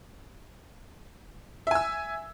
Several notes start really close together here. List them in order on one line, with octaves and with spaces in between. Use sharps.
E5 G#5 E6